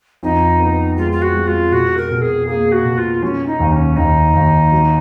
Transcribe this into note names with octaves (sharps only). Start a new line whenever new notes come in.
F2 D#4
B3
G#3 F4
F4
F#4
G#3
F4
B2 F#4
A#4
B2
G#4
A#3 G#4
F#4
B2
F4
F#3 C#4
D#4
D#2
C#4
D#2 D#4
D#2
F#3